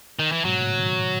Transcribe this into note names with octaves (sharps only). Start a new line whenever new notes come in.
D#3
E3
G#2 B2 F#3
A2 C#3
B2 D#3